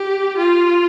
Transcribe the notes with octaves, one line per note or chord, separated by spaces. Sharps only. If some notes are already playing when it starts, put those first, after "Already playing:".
Already playing: G4
F4